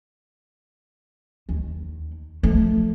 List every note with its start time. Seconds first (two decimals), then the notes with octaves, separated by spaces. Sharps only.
1.49 D#2
2.43 F3 A3